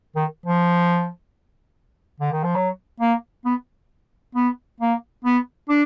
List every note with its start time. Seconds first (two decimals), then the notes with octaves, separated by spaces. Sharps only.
0.16 D#3
0.46 F3
2.20 D3
2.32 D#3
2.43 F3
2.55 F#3
3.00 A#3
3.45 B3
4.35 B3
4.80 A#3
5.24 B3
5.69 D4